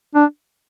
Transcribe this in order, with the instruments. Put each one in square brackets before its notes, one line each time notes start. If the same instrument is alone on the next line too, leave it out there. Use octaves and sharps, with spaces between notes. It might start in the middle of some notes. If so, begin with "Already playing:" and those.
[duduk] D4